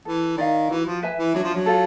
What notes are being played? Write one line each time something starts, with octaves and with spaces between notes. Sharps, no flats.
E3 A4
D#3 D5 F5
E3 F#4
F3
B4 E5 G#5
E3
F#3 D4
F3
F#3
F4 A4